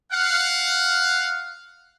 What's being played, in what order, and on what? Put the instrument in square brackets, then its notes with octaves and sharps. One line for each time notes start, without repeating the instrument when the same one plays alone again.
[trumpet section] F5 F#5